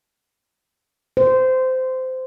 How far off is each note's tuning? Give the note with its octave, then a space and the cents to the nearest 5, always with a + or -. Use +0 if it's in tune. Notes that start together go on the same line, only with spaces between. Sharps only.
C5 -20